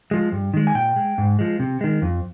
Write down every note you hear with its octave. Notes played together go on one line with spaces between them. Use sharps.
F3 G#3
G2
D#3 G#3
G#5
A#2 G5
G#3
G#2
F3 G#3
C3
D#3 G#3
F2